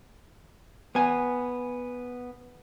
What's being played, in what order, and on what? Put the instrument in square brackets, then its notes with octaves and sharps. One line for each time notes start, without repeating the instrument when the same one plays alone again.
[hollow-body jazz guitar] B3 G#5